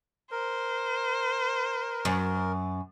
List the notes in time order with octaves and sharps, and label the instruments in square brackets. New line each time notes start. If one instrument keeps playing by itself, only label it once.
[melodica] A#4 [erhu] C5
[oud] F#2